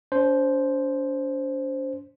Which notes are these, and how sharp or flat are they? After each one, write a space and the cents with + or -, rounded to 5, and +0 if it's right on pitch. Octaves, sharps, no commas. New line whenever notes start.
D4 -45 C5 +0